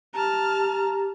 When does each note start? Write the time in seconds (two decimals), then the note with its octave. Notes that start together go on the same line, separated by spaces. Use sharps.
0.14 G4 A5 A#5 F6